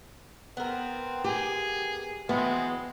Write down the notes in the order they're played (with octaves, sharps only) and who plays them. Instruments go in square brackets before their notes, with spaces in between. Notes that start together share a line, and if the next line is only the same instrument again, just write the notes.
[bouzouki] B3 A#4 [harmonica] C4
[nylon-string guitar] G4 [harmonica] G#4
[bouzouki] E3 [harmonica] F#3 G#3 C4 [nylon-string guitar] B3